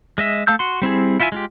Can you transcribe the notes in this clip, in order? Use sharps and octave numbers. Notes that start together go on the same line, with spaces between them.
G#3 D#5 E5
A3 F5 A5 E6 G6
F#4 C6
G3 C4 E4 G#4
E4 F4 E5 G5 G#5
G#3 F4 G4